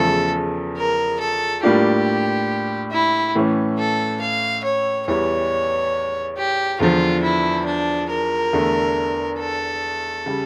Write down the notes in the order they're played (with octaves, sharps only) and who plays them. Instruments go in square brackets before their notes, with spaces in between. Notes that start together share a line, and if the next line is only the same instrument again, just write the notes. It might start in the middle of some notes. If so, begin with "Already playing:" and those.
Already playing: [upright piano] E2 C#3 F3 A3 [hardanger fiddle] A4
[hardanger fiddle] A#4
A4
[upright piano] A2 G3 A#3 D4 F4 [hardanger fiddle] G4
[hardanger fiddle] E4
[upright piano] A2 E3 A3 C#4
[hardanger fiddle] A4
F5
C#5
[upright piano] E2 E3 G3 [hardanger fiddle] C#5
[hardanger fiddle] G4
[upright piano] E2 D3 F3 [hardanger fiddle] F4
[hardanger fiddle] E4
D4
A#4
[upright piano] E2 D3 A3
[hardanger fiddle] A4
[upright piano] C#3 G3